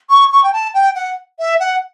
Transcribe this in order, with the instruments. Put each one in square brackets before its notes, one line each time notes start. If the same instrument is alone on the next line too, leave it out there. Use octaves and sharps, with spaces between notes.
[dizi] C#6
C#6
G5
A5
G5
F#5
E5
F#5